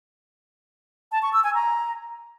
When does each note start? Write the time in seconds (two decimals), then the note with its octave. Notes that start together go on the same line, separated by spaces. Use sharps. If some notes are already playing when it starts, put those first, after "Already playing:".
1.12 A5
1.23 C#6
1.33 E6
1.44 G#5
1.54 A#5